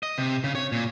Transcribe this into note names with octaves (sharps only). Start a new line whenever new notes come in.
D#5
C3
C#3
C#5
A#2